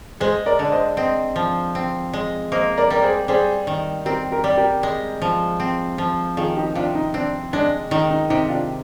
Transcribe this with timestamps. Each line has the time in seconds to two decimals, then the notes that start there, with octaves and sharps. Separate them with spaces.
0.20 G#3 G#4 C5
0.46 A#4 D5
0.59 D3
0.72 C5 D#5
0.97 C4 C5 D#5
1.36 F3
1.75 C4
2.13 G#3
2.52 A#3 C5 D#5
2.77 A#4 D5
2.90 G3 A#4
3.03 G#4 C5
3.28 G3 G#4 C5
3.67 D#3
4.05 C4 G4 A#4
4.31 G4 A#4
4.44 G3
4.57 G4 A#4
4.83 G#3
5.22 F3
5.60 C4
5.98 F3
6.37 D#3 F4 G#4
6.56 D#4 G4
6.75 C3 D4 F4
6.95 D#4
7.14 C4 D4
7.53 G#3 D4
7.91 D#3 D#4
8.11 D#4
8.30 C3 D#4
8.49 D4 F4